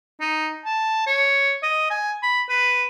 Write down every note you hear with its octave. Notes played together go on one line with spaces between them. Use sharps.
D#4
A5
C#5
D#5
G#5
B5
B4